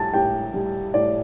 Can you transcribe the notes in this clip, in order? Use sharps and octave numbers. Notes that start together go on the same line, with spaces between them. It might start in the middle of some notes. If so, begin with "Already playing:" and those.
Already playing: A2 G3 A5 A6
A2 G4 G5
G3
A2 D5